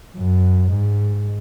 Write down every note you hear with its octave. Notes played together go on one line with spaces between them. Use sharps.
F#2
G#2